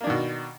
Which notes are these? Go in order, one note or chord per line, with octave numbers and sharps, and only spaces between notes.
B2 D#3 A#3 D4